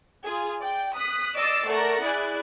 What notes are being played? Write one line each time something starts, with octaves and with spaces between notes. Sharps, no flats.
F4 G#4
D5 G5
D#6 F#6 B6
D5 D#5 D6 E6 A6 C7
A3 A#4 D5 F#5 A#6
E4 G#4 D5 F#6